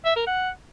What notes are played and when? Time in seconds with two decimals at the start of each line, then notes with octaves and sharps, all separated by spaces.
0.05 E5
0.16 A#4
0.27 F#5